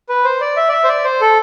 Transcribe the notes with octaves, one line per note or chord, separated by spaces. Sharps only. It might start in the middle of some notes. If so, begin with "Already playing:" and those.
B4
C5
D5
E5
D5
E5
C5
D5
C5
A4